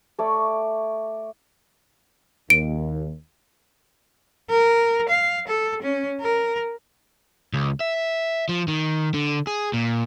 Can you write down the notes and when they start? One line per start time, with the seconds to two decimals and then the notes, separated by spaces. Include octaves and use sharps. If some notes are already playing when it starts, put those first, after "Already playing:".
0.19 A3 C#5 D5
2.50 D#2 D7
4.50 A#4
5.09 F5
5.48 A4
5.82 C#4
6.21 A#4
7.53 C#2
7.80 E5
8.49 F3
8.68 D#3
9.14 D3
9.47 G#4
9.73 A#2